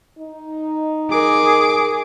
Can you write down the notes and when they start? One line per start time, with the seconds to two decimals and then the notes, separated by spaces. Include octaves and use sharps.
0.19 D#4
1.11 F#4 G#4 A#4 D6